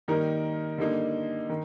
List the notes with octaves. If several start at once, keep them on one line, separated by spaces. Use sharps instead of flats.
D#3 G3 A#3 D#4 A#4
D3 G3 A#3 D#4
D#3